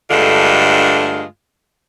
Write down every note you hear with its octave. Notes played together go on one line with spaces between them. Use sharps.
G2 D3 G#3 A3 F4